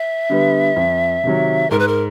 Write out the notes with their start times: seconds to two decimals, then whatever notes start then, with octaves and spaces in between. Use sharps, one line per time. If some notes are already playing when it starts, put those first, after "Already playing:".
Already playing: E5
0.30 D3 G3 B3
0.76 F2
1.24 C3 D#3 F#3
1.71 G#2 A#4
1.79 B4
1.88 A#4